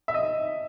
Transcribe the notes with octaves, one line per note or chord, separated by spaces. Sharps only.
E5
D#5